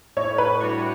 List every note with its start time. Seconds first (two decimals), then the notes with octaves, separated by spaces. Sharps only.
0.17 A2 C#5
0.38 B4
0.60 G3 D4 F#4 C#5